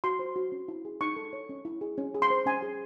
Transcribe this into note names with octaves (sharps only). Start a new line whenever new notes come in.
F#4 C6
C5
F#4
C#4
E4
G#4
D#4 C#6
A4
C#5
C#4
E4
G#4
C#4
G#4
C6
C5
C#4 G#5
G#4